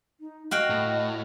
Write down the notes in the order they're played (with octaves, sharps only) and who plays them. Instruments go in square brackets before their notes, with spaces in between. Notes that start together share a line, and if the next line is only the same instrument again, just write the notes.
[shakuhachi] D#4
[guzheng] F#4 F5 G5 [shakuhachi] D#5
[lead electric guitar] A2